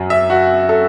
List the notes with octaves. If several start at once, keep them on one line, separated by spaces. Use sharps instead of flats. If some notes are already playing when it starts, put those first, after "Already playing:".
Already playing: F#2 F#3
E5
F#4
A4